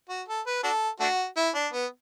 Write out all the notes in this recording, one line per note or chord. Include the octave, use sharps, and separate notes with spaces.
F#4
A4
B4
D4 F#4 A4
A3 D4 F#4
E4
D4
B3